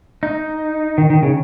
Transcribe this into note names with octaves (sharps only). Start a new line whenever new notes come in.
D#4
D#3
D#3
C#3